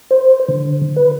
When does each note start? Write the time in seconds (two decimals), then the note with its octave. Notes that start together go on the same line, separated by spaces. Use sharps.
0.11 C5
0.49 D3
0.96 B4